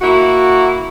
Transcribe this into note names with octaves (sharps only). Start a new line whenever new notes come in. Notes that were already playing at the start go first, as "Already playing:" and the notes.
A#3 E4 F#4